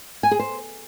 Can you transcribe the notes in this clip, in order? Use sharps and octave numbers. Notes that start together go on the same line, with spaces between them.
G#5
G#4
C5